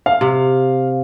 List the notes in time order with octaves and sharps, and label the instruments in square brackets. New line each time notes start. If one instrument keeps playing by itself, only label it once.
[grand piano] F5
[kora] C3